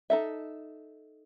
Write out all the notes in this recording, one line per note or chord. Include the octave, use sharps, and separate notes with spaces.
D#4 A4 E5